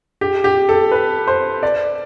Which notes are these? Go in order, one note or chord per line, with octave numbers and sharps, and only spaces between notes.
G4
G4
A4
B4
C5
D5